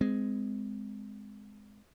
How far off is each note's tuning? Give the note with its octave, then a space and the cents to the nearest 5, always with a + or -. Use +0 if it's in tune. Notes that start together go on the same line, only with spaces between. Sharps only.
G#3 +0 C4 -30